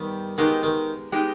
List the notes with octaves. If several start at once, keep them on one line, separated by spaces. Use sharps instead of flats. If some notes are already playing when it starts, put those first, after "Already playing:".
Already playing: G2 D#3 G3 B3 G4
D#3 G#3 B3 D#4 G4
D#3
G#3 B3 D#4 G4